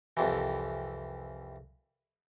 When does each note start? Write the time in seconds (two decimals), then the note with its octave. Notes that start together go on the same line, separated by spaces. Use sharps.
0.17 C2 F2 E3